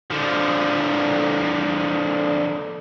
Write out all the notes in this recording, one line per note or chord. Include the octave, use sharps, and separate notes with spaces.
D3 F3